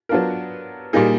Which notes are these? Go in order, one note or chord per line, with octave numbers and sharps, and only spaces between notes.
F#3 B3 D4 F4 A#4
A#2 G3 A#3 D#4 G#4